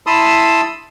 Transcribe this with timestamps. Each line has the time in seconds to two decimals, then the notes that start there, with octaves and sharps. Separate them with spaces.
0.07 E4 A5 B5 C6 D#6 E6